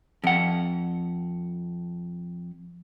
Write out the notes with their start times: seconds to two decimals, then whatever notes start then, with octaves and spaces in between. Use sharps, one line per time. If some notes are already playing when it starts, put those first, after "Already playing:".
0.24 F2 F#5